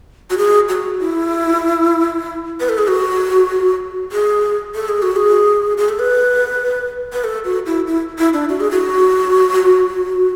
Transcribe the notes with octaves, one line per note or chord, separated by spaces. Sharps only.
F#4
G#4
F#4
E4
B4
A4
G#4
F#4
G#4
A4
G#4
F#4
G#4
G#4
A4
B4
B4
A4
F#4
E4
E4
E4
D4
F#4
G#4
F#4